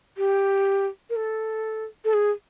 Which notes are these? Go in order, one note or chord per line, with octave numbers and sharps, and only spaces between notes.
G4
A#4
A4
A4
G#4